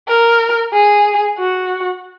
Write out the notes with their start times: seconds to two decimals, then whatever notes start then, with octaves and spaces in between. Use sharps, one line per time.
0.08 A#4
0.73 G#4
1.38 F#4